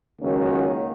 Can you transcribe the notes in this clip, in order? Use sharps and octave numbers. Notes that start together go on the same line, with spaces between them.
C#2 D#3 F#3 A#3 C#4